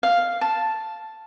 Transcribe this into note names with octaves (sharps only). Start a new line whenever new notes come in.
F5
A5